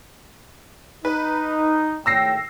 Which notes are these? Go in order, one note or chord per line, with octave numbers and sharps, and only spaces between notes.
D#4 B4
G#1 A2 G5 E6 A#6 C7